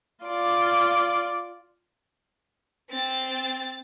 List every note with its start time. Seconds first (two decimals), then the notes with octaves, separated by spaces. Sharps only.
0.24 F4 D5 D6
2.90 C4 A6